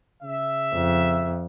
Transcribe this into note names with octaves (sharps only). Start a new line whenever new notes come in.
C#3 E5
F2